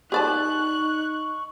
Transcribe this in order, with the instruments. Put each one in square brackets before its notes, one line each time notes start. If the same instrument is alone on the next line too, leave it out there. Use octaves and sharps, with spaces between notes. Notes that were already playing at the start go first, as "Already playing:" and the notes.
[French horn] D#4 [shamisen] G4 D5 A5 [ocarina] C#6 [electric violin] F#6